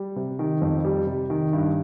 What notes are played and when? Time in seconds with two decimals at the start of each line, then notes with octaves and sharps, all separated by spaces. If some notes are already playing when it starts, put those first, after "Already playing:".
Already playing: G3
0.16 C3
0.39 D#3
0.62 F2
0.85 G3
1.07 C3
1.30 D#3
1.53 G2